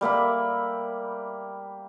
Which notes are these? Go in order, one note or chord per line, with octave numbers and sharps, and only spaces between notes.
G3 A#3 E5 B5